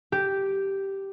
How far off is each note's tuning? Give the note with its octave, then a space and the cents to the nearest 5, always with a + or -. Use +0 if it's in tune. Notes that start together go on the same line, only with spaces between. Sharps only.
G4 -5